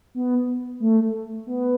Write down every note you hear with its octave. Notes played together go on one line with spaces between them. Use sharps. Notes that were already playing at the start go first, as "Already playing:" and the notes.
B3
A3
B3